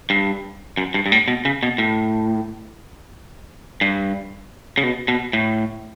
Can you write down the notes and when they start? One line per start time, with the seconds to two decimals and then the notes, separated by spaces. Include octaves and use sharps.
0.10 G2
0.77 F#2
0.94 G2
1.06 G2
1.12 A2
1.28 B2
1.45 C#3
1.63 B2
1.78 A2
3.81 G2
4.78 C#3
4.83 B2
5.08 B2
5.33 A2